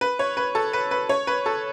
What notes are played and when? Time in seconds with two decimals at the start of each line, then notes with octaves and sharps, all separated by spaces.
0.01 B4
0.19 C#5
0.37 B4
0.55 A4
0.73 B4
0.91 B4
1.09 C#5
1.27 B4
1.46 A4